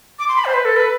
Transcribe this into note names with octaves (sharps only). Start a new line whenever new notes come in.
D6
C6
B5
C5
B4
A4
B4